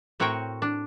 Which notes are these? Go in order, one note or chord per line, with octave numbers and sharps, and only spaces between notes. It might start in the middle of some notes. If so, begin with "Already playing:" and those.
A2 C4 F#4 A#4 C#5 G5
D4